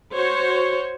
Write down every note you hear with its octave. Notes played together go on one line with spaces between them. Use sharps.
F#4 C5 C#5